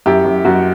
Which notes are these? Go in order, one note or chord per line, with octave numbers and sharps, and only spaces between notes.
F#2 E4 G4
F#2
F#2 F#4